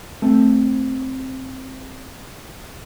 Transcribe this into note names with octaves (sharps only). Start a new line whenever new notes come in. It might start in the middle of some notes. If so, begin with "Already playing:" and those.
A3 C4